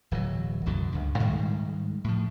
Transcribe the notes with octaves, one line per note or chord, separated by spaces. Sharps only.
D1 E3 F#3
C2 F#2 B2 D3
C#2 G2
G#2 D#3 G3 G#3
A2 F3